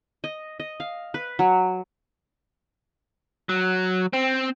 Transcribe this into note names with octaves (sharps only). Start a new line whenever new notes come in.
D#5
D#5
F5
B4
F#3
F#3
C4